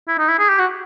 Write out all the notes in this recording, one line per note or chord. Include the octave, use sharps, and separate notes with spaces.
E4
D#4
E4
G#4
G4
F#4